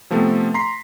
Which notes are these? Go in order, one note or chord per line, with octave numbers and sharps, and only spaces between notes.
C3 F3 A3 B3 C4 A4
A#5 C6 B6 C7